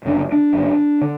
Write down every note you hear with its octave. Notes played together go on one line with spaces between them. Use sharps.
F#1 F#2 D3 D4
D4
F#1 F#2 D3
D3